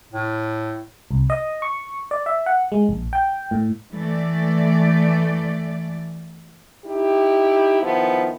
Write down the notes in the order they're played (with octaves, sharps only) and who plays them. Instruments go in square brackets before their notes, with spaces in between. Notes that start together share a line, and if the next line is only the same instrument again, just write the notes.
[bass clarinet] A2
[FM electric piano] C2
D#5
C#6
D5
E5
F#5
G#3
A#1
G5
A2
[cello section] E3 A3 D5
[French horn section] D#4 E4 G4
D#3 F3 B3 E4